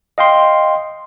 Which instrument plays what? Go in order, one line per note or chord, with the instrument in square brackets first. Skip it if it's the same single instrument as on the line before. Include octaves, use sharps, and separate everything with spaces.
[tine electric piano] D#5 F5 G5 C6